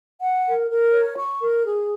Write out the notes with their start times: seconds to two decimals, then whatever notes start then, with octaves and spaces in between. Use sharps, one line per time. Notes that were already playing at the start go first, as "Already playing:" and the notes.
0.22 F#5
0.46 A#4
0.69 A#4
0.92 C#5
1.16 C#6
1.39 A#4
1.63 G#4